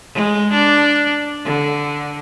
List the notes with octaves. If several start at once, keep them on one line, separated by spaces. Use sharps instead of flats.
G#3
D4
D3